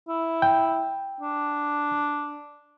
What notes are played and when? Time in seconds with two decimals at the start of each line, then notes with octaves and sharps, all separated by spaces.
0.08 E4
0.42 G5
1.21 D4